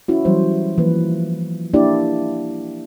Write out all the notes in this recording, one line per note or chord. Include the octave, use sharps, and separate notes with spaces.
C#4 E4 F#4
E3 F#3 G3 C5
E3 F3 A#3 B4
A#3 D4 E4 G4 D5